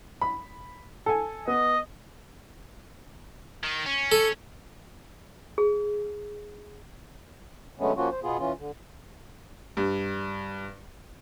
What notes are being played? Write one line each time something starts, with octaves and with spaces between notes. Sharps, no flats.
B5
A4 G#5
B3 D#5
D#3
C#4
A4
G#4
D3 F#3 G#3 A3 B3 C#4
F3 A#3 C#4 F4 F#4
C5
B2 B3 F4 G#4
E3 C#4 F4
D3
G2